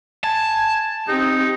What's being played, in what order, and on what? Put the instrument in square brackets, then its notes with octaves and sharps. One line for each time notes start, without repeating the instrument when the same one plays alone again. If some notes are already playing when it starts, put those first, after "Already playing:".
[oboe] G#5 [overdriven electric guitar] A5
[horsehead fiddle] C4 G4 [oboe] D#4